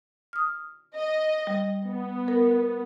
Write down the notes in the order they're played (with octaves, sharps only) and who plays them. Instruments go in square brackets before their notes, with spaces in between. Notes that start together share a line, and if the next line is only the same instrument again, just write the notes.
[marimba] D#6 F6
[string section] D#5
[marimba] G3
[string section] B3
[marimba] A#4